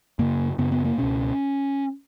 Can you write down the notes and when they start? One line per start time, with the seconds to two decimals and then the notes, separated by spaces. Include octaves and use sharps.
0.19 F#2 C#3 A#3
0.58 F#2 C#3 B3
0.72 B3
0.85 A#3
0.98 C#2 B2 C#4